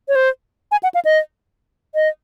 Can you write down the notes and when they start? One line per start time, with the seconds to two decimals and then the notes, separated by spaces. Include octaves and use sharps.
0.08 C#5
0.15 C5
0.71 G#5
0.83 F#5
0.95 F5
1.05 D#5
1.95 D#5